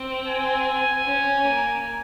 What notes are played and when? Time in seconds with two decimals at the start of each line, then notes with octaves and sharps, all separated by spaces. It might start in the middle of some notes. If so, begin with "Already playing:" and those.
Already playing: C4
0.27 G#5
1.05 C#4
1.44 A#3